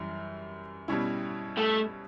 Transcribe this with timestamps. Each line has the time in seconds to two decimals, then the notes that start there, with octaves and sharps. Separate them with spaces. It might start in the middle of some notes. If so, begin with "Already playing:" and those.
Already playing: F#2 E3 G3
0.88 B2 G3 C#4 E4
1.57 A3